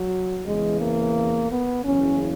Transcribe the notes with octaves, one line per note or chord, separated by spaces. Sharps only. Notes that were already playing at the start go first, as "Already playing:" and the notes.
Already playing: F#3
E2 C#3 E3 G#3
A#3
B3
F#1 E2 C#3 E3 C#4